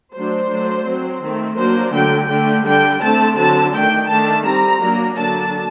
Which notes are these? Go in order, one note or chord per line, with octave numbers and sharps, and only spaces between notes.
F#3 A3 D4 C5
F#3 A3 D4
F#3 C4
D#3 A3 C4
F#3 A#3 D4 C5
D3 F#3 A3 G5
D3 A3 D4 G5
D3 G3 D4 G5
D3 A3 C4 A5
D3 F#3 C4 A5
D#3 A3 D4 G5
D#3 A3 D4 A5
G3 C4 A#5
F#3 A#3 D4
D3 F#3 A#3 D4 A5